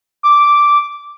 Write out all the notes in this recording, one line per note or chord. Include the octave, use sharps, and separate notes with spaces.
D6